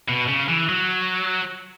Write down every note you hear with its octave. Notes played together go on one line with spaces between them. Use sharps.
B2
C#3
E3
F#3